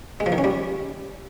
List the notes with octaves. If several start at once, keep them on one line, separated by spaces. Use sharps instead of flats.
G#3
F3
D#3
C#4
G3